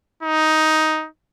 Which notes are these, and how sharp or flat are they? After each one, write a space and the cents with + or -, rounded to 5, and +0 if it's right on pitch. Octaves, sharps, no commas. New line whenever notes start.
D#4 +10